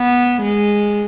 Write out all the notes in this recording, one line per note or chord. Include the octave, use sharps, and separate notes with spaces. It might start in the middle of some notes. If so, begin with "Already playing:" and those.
Already playing: B3
G#3